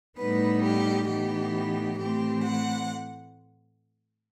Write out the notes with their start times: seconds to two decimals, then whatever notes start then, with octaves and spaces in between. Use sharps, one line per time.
0.19 A2 G3 B3 D#4 B4
0.63 G4
1.08 A2 E3 B3 D#4 G4
1.98 A2 E3 A3 C4 G4
2.43 F#5